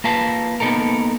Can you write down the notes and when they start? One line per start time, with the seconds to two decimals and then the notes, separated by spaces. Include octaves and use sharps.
0.04 A#3 F4 B4 F5 A5
0.60 A#3 B3 C#4 D#4 A4 A#4